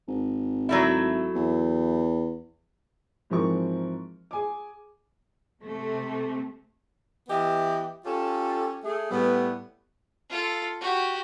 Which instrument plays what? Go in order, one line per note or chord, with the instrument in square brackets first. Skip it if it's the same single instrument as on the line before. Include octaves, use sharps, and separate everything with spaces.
[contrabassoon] G#1
[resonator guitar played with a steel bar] F#3 A3 E4
[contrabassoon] E2
[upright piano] G#2 E3 F3 C4 A#4 C#6
G#4 G#5 D6
[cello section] C3 A3
[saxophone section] E3 B3 G4 D#5 E5
C#4 F4 G4 A4
A3 G#4
A2 G3 B3
[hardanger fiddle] F4 A4
F#4 G4